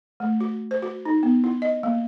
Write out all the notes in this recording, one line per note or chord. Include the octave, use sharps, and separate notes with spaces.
A3
F#4
C5
F#4
D#4
B3
E4
D#5
A#3